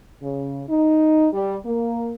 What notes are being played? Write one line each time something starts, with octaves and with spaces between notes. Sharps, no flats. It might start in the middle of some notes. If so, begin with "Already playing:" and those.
C#3
D#4
G3
A#3